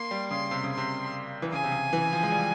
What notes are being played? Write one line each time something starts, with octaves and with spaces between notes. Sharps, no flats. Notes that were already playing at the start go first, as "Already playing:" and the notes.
Already playing: A#3 C6
G3
C#3 C6
C3
C#3
C6
C3
E3
C#3 G#5
C3
C#3
E3
F3
G#3
G3